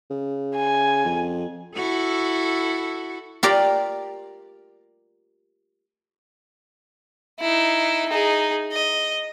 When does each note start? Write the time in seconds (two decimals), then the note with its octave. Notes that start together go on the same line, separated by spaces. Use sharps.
0.11 C#3
0.56 G#5
1.05 F2
1.75 E4 F#4 A4
3.43 F4 G4 A#4 D5
7.40 D#4 E4
8.09 D#4 G#4
8.73 D#5